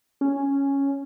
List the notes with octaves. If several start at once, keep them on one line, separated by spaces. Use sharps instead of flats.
C#4